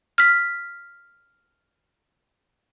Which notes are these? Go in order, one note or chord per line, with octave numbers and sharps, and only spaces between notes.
F6 B6